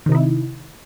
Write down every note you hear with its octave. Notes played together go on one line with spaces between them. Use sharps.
C3 D#3 D#4 E4